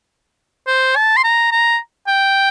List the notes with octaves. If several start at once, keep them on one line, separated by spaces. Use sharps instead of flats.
C5
A5
C6
A#5
A#5
G5